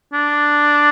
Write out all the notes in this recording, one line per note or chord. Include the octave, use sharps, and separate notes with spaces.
D4